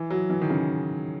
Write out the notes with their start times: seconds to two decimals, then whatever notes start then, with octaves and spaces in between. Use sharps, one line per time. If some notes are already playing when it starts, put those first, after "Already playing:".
Already playing: E3
0.10 F#3
0.30 E3
0.41 D#3
0.50 C#3